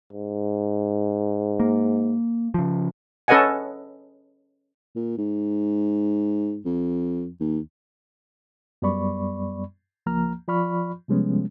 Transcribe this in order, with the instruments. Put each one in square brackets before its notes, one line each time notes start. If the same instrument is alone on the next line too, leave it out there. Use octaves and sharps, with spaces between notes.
[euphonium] G#2
[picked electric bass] A#3
C#3 F3
[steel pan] C#4 A4 B4 D#5 F#5 G#5
[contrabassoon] A#2
G#2
F2
D#2
[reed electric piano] F#2 G3 B3 D5 B5 C#6
C#2 F3 A#3 A#5 F6
F3 F4 D5 B5 C#6 F6
C3 F3 G3 G#3 B3 C#4